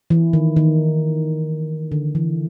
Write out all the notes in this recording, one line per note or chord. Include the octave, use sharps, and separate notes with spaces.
E3
D#3
D#3
D3
E3